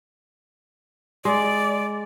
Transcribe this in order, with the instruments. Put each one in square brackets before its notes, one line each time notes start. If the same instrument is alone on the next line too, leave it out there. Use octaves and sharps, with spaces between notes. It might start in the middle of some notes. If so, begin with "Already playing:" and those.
[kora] G#3 [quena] D5